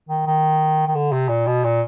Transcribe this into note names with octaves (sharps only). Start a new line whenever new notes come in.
D#3
D#3
D#3
D3
C3
A#2
B2
A#2